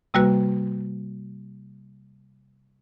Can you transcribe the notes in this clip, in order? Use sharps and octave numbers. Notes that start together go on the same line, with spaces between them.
C3 G3 A#3 F#4 B4